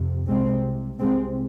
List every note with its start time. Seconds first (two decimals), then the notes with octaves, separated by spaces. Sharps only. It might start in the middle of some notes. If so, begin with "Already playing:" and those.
Already playing: F2 C3
0.27 C2 C3 G#3 C4
1.00 C2 C3 G#3 C4